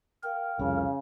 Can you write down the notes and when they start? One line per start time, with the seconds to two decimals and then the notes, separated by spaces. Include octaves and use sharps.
0.23 A#4 F5 G5
0.59 C2 F2 C#3 F5